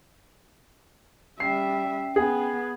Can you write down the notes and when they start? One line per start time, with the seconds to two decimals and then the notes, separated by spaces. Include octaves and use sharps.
1.40 G3 C#4 E5 G5 C7
2.16 B3 G#4